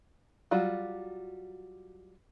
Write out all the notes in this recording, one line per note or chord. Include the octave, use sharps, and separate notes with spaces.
F#3 G3 F4 F#4